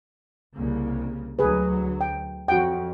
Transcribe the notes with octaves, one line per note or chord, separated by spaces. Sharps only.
C2 C#3 A#3
D2 F#3 G#4 B4
G5
F2 F#4 F#5 G5